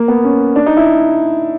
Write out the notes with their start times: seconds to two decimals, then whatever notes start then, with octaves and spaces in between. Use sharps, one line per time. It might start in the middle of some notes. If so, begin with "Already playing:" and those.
Already playing: A#3
0.08 B3
0.24 C#4
0.56 D4
0.66 D#4
0.77 E4